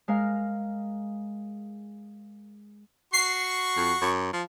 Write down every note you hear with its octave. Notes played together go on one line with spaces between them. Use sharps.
G#3 A#4 F5
F#4 C#6 C7
F2
F#2
F3